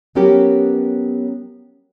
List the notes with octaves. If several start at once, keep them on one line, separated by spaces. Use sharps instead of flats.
F#3 B3 C#4 G4 A#4